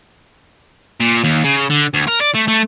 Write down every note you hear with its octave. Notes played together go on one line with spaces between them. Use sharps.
A#2
D#2
C#3
D3
D2
A#4
D5
A3
A3